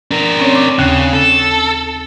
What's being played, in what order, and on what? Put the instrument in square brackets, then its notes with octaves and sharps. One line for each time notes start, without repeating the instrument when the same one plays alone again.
[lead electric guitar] D4 A#4
[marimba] C4 C#4 C#5
D6
[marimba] D#2 [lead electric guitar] C#3
[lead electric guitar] A4